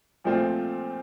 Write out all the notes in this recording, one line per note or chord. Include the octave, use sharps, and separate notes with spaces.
A#2 F3 A3 C4 F4